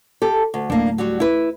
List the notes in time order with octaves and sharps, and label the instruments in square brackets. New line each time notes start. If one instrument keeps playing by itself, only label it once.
[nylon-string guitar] G4 A4
D2
[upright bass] D1 [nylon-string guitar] A#3 D4
[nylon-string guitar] F#3 G3 F#4
E4 B4